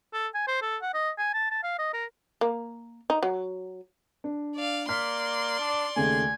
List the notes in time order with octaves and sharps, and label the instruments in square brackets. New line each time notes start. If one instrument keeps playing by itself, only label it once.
[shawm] A4
G#5
C5
A4
F#5
D#5
G#5
A5
A5
F5
D#5
A#4
[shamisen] A#3
D#4
F#3
[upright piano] D4
[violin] D5 F5
[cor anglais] A#3 [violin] D5 C6 [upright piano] F6 B6
[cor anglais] D4
[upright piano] D#2 C#3 A3 [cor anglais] G#5